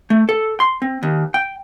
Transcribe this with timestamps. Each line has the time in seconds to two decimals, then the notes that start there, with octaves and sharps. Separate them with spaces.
0.10 A3
0.29 A4
0.60 C6
0.82 C4
1.03 D#2
1.34 G5